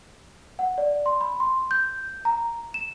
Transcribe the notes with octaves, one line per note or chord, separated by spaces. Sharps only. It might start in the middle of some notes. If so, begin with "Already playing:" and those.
F#5
D5
C6
B5
C6
G6
A#5
E7